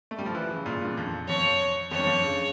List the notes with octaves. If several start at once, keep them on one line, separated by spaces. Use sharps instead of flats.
A3
G3
F3
E3
C#3
A#2
G2
F2
F2 C#5
F2 C#5
G2
F2
C#3